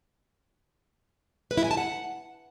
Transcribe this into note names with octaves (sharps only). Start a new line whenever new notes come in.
B4
E4
G#5
A5
F#5